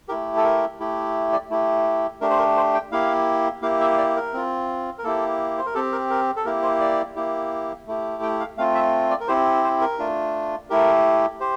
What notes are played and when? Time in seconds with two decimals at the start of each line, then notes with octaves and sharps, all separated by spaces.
0.09 A3 E4 G4 A#4
0.37 A4
0.44 A#4
0.80 A3 E4 G4
1.32 D5
1.50 A3 E4 G4
2.21 A3 D4 G4 A#4
2.30 C5
2.38 A#4
2.56 C5
2.74 G5
2.92 A#3 E4 G4 F5
3.62 A#3 E4 G4 F5
3.81 E5
3.98 D5
4.16 A#4
4.33 C4 F4
4.98 A#4
5.04 A#3 E4 G4 A4
5.58 C5
5.66 A#4
5.75 C4 G4 A4
5.92 A#4
6.10 A#4
6.36 A4
6.45 A#3 E4 G4 A#4
6.62 C5
6.80 D5
7.16 A#3 E4 G4
7.87 A3 E4 G4
8.23 G5
8.40 F5
8.57 A3 C4 F4 F5
8.75 E5
9.10 D5
9.20 A#4
9.28 C4 E4 G4 C5
9.64 C5
9.81 A#4
9.99 A3 D4 F4
10.70 A3 E4 G4 A#4
11.40 G4 C5